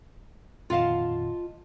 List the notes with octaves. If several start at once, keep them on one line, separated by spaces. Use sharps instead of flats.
F2 A#2 D#3 F4 D#5 F5 F#5 A5